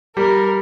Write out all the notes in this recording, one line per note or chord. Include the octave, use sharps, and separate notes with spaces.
G3 A#4